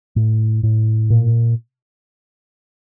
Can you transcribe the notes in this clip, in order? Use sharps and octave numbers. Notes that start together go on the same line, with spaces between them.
A2
A2
A#2